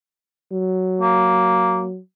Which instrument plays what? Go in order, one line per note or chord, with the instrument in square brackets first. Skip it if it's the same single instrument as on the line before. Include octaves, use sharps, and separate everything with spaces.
[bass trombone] F#3
[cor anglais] A#3